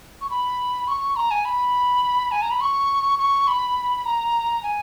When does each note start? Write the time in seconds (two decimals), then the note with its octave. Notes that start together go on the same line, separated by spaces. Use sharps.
0.21 C#6
0.30 B5
0.88 C#6
1.16 A#5
1.31 G#5
1.45 B5
2.32 G#5
2.42 A#5
2.51 B5
2.61 C#6
3.19 C#6
3.47 B5
4.05 A#5
4.63 G#5